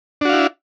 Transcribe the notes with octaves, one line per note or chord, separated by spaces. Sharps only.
D4 E4 F#4 F5